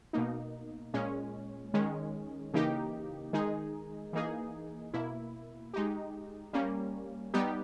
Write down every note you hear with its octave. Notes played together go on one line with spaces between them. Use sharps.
B2 A#3 D#4
A#2 G#3 C#4
D#3 G#3 C#4
C#3 E3 A#3 D#4 G4
D#3 G#3 D#4 G#4
E3 A#3 D#4 G#4
B2 A#3 E4
G#3 D#4 G4
G3 A#3 C#4
G3 B3 D#4 G4